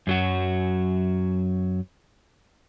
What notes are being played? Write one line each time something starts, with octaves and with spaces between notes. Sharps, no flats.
F#2 F#3 F#4